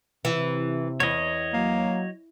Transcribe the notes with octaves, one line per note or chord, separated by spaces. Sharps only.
C3 E3
E2 C#5 D#5
F#3 A#3